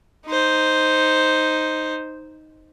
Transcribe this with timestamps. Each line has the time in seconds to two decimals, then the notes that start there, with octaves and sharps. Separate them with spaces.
0.26 D#4 C5